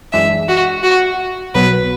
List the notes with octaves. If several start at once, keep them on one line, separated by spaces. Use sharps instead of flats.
F#2 E3 G#3 D4 E5
F#4
F#4
B1 B2 F#3 B3 B4